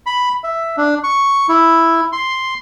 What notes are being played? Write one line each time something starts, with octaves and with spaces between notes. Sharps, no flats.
B5
E5
D4
C#6
E4
C6